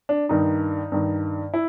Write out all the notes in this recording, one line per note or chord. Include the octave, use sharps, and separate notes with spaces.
D4
G2 D#3 D#4
G2 D#3
E4